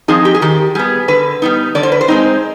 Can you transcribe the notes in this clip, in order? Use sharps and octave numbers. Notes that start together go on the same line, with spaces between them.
F3 C4 D#4 G#4
G4
G#4
D#3 G4
G3 B3 G#4
D3 B4
G3 B3 D#4
D3 D5
C5
B4
C5
G#3 C4 D#4